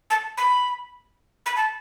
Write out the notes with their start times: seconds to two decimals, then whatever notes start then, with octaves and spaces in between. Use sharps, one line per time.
0.10 A5
0.37 B5
1.46 B5
1.56 A5